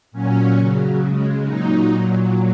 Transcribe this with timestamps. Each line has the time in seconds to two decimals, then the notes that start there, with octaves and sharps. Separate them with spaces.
0.12 A#2 F#3 C#4
0.56 C#3 F#3
1.01 C#3 G#3
1.44 A#2 F#3 D#4
1.90 A#2 F#3